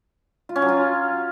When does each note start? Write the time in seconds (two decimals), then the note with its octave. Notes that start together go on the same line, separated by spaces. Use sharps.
0.49 F4
0.56 C#4
0.62 F#3
0.68 F4